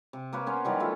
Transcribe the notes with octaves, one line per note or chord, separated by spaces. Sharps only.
C3
A#3 A#4 B4 C#5
B3 C#4 C5
D#3 E3 F#3 G3
A3 F4 A4